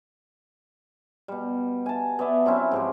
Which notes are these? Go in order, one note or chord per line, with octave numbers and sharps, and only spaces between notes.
B2 G3
G#5 A5
B3 D5 E5 A5
F#3 C4 C#4 E4
G#2 F3 G4